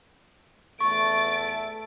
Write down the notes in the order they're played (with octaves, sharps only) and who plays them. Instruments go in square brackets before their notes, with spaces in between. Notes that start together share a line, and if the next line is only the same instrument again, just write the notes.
[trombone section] E2 A3 [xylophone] C#6 [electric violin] A6 D7